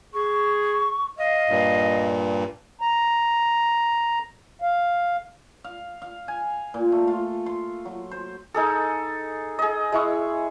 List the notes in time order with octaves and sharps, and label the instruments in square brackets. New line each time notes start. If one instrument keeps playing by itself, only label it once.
[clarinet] G#4 [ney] C#6
[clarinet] D#5 [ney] F5
[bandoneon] G2 A#2
[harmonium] A#5
F5
[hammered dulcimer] F5
F5
G#5
A#2
A3
F4
C6
F#3
C5
[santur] D#4 G#4 A4
G#4 D#5
G#3 E4 C#6